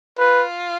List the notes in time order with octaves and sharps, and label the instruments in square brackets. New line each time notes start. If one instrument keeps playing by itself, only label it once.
[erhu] F4 [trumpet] B4